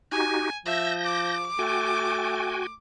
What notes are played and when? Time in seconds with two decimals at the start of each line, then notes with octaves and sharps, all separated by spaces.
0.11 D#4 F#4 G4 G#5
0.66 F3 E5 G6 A#6
1.05 D6
1.59 A3 F#4 G5 G#5